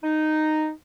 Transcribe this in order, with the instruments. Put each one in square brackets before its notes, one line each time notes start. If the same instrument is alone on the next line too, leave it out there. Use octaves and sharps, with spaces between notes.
[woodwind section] D#4